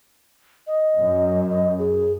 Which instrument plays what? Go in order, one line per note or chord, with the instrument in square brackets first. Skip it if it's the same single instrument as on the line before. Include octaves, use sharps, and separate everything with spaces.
[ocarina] D#5
[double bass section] F#2
[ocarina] D#5
G#4